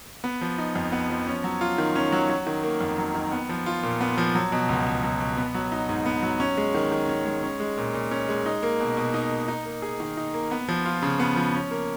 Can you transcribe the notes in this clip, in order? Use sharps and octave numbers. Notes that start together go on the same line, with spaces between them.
B3
F3
D#4
F2
B3
F3
C#4
F#3
F4
D#3
C#4
F#3
F#3
D#3
A#3
F2
F#3
D#3
B3
F3
F4
A#2
B3
F3
F#3
B2
C#2
C#2
F#3
B2
B3
F#3
D#4
G#2
B3
F#3
C#4
G#3
D#3
D#3
C#4
G#3
C#4
G#3
A#2
A#2
C#4
G#3
D#4
A#3
B2
B2
D#4
A#3
D#4
A#3
G#4
D#3
D#4
A#3
B3
F3
F4
C#3
B3
F3
C#4
A#3